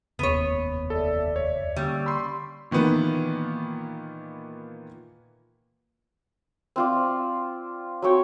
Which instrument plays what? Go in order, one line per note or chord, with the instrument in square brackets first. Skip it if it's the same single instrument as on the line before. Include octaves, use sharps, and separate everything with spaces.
[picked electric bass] F1 D#2 C#3 [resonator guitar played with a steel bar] B3 C#5
[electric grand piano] A4 [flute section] D5 E5
[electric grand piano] C#5
[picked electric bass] D3 A#3 C#4 [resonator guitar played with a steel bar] G3 [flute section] C#6 E6
[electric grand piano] B5 C6
[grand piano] A#2 D#3 E3 B3
[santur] C4 F4 D5
F#3 C4 C#5 G5